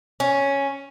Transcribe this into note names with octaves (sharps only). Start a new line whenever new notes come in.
C#4